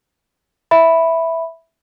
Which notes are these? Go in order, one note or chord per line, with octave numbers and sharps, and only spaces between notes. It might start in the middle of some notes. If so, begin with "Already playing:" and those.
E5 B5